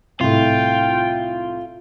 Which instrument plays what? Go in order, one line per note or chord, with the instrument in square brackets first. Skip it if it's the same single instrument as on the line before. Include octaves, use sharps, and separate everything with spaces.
[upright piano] C2 A2 [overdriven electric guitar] F4 [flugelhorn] G5